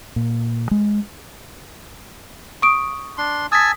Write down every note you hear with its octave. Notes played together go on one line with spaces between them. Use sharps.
A#2
G#3
C#6 D#6 D7
D4 C6
G#5 A5 D#6 E6 B6